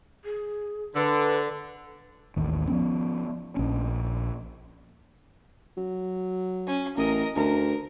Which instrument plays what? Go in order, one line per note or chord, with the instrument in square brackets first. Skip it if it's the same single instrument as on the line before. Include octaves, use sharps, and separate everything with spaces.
[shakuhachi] G#4
[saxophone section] D3 [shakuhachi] B4
[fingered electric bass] A1 D#2 D#3
F3 B3 C#4
A#1 C#4
[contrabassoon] F#3
[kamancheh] C#4
[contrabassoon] A1 [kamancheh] A#4 D#5
[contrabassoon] D2 [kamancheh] A#4